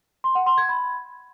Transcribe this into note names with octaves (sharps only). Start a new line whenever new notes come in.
C6
F#5
C6
G#6
B5